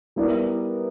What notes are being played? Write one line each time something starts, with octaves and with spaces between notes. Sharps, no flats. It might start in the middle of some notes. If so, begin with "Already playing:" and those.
G3 B3 E4 A#4 D5